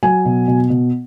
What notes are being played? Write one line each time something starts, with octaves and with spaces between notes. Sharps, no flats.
F#3 G#5
B2
B2
B2